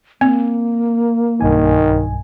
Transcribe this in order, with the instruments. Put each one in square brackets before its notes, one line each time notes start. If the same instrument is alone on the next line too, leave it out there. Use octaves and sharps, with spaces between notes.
[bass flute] A#3 [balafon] C4
[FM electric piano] B1 G2 G#5 [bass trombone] D#3